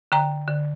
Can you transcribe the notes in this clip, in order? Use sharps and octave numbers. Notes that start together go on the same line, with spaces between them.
D3 G5 A#5
D3